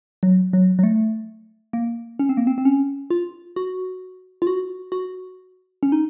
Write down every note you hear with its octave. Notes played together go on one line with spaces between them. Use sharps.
F#3
F#3
F#3
A3
A#3
C#4
C4
A#3
C4
C4
C#4
F4
F#4
F4
F#4
F#4
C#4
D#4